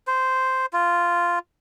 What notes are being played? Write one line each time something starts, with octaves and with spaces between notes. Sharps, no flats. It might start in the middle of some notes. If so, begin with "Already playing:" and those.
C5
F4